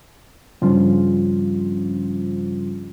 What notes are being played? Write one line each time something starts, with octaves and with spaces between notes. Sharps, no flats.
G2 C#3 F3 G3 C#4 F4